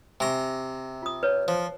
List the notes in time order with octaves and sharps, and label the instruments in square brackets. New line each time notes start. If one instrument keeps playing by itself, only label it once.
[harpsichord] C3 A#5 [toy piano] G#5 C#6
[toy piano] F4 D#6
B4 C#5
[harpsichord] F3 [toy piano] C5